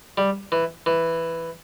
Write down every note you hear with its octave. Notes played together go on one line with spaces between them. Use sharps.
G3
E3
E3